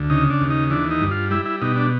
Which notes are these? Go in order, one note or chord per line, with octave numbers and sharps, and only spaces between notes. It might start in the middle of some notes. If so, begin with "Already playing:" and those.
Already playing: D2
C#3 D#4
D4
D#2
D#4
E3 D4
D#4
G2
F4
G3 E4
E4
B2 D#4
D4